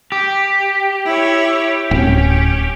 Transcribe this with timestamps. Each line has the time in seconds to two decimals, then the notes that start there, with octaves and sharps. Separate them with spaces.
0.12 G4
1.06 E4 C#5
1.91 D1 C#4